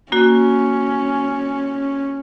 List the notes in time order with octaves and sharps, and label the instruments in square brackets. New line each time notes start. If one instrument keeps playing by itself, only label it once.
[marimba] A#3 F#4 [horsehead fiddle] C#4